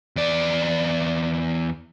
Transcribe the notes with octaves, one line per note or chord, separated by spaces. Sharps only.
E2 D5